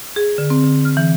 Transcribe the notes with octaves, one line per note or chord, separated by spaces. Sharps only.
G#4
D3
C4
D3
F6
E3